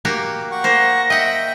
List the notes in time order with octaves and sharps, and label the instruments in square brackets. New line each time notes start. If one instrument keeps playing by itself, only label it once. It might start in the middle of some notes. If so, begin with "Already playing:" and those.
[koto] A#3 F#4 G4
[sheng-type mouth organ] F#5 C#6
[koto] A#3 C5 [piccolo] A#6
[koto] D#5 F#5 [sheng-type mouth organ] E5 G5